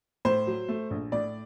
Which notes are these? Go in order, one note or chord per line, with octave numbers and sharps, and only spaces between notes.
A2 C5
F#3
A3
A#1
A2 D5